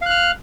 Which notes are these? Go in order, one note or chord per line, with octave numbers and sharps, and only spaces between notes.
F5 F6 F#6